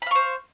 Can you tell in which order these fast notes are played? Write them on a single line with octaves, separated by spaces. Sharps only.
B5 F5 C#6 C5